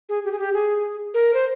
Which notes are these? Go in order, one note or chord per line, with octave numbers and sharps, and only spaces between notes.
G#4
G4
G#4
G4
G#4
A#4
C5